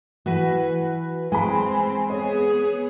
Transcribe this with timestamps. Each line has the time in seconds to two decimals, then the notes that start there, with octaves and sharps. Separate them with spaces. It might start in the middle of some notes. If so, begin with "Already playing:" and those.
0.26 E3 F#4 B4
1.32 G#3 C4 G#5 B5
2.10 B3 G#4 C#5